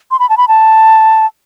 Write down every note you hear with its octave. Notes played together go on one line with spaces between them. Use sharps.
C6
B5
A5
B5
A5